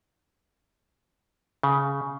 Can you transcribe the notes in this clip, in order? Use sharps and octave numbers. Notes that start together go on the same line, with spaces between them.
C#3